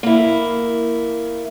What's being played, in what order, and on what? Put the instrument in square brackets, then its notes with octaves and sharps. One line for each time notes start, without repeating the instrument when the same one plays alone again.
[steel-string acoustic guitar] A#3 E4